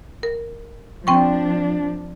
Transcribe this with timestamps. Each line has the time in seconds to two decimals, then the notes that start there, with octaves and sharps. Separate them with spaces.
0.23 A#4
1.07 F3 C4 D4 G5 C#6